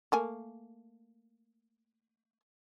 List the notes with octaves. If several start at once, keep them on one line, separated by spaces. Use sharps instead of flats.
A3 A#3 G#5